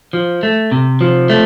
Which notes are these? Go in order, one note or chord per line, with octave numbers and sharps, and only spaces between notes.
F3
A3
C3
F3
A3